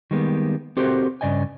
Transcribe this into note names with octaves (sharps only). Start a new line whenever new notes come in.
D#3 G3 G#3 A#3 B3
C4 F#4 G4 A4 A#4 C5
G2 C#3 D5 D#5 G#5